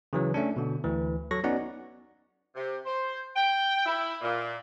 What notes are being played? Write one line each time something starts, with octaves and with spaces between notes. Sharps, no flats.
C#3 E3 F#3
A3 C#4 D4
B2 D3
D2 E3
F#3 A4 C#6 A#6
B3 C#4 D#4 F#4 D5 F#5
C3
C5
G5
E4
A#2